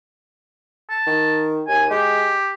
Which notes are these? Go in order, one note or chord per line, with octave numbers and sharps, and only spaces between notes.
A5
D#3
D#2 G#5
G#3 G4